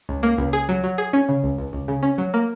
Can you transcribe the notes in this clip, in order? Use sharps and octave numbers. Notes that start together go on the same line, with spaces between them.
C#2
A#3
C#2
G#4
F#3
F#3
G#4
C#4
C#3
C#2
C#2
C#2
C#3
C#4
F#3
A#3